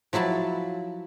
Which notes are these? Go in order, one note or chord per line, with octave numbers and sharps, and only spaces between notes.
F3 F#3 E4 A5 B5